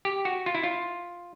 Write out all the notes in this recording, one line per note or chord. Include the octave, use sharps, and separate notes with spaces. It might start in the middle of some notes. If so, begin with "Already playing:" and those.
G4
F#4
F4
E4
F4